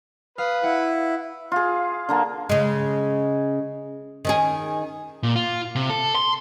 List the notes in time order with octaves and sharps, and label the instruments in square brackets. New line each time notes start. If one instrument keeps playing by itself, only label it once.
[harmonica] B4 [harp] F5 [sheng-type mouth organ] D#6
[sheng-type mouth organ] E4 [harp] F#5
[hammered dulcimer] F4 G#4
D3 A#3 A5
[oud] C#3 G#3
D#3 C#4 G#4
[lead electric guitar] A#2
F4
C3
A4
C6